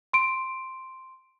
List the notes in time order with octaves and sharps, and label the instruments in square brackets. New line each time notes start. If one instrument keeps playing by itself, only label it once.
[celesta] C6 D7